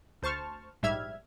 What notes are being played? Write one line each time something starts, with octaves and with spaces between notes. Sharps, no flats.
D2 C5 A5 C#6 F6
A#1 G#2 G3 E5 F6 G#6